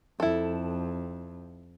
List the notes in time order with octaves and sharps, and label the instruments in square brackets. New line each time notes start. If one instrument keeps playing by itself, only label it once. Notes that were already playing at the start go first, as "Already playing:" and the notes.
[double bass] F2 [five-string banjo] E4 A4